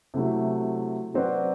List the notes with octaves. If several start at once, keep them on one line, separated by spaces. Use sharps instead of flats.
C3 F#3 A3 E4
F#3 C4 F#4 B4 D5